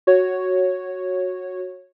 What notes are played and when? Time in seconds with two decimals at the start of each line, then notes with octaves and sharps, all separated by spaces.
0.07 F#4 C#5